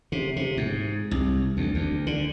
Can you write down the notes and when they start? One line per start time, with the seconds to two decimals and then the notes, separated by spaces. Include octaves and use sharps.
0.12 C3
0.36 C3
0.57 G#2
1.11 C2
1.57 D2
1.75 D2
2.07 D3